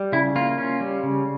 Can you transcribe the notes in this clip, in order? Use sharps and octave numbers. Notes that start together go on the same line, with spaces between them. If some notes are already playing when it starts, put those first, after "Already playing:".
Already playing: G3
C#3 E4
A#3 F4
C#4
G3
C#3